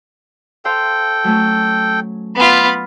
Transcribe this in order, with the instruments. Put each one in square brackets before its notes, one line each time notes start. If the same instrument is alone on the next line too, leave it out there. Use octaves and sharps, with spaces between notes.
[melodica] A4 G5 [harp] C5 F5
[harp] F#3 A3 C#4
[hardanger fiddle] B3 F4 [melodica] B5